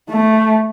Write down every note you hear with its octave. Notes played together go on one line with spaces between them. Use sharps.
A3